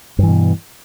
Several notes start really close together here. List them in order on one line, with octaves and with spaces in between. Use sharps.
G2 E3 B2